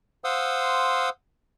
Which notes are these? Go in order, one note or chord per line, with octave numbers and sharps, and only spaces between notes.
C5 F5 F#5 C6 D#6 E6